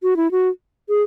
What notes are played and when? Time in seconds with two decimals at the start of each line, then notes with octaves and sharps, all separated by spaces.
0.03 F#4
0.17 E4
0.31 F#4
0.89 G#4